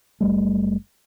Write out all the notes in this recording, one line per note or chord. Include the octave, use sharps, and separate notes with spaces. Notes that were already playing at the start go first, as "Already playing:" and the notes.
F#1 G3 A3